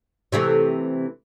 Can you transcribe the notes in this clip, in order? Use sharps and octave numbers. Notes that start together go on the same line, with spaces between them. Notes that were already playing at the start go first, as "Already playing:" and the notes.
C3 E3 A3